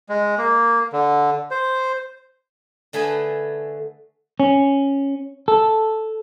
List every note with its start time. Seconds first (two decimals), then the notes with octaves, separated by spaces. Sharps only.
0.09 G#3
0.38 A#3
0.93 D3
1.51 C5
2.93 D3 A3 G#4 B4 G#5
4.40 C#4
5.48 A4